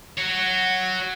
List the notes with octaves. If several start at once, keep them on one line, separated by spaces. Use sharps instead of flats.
F#4 C#5